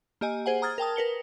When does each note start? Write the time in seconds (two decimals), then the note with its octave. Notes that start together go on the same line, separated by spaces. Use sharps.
0.21 A#3 G4 D#5 G#5
0.46 G#4 C5 F#5 G#5
0.62 A#5 D#6 F6 G#6 A6
0.78 A#4 G5 A5 D#6
0.96 A#4 B4 C#7 G7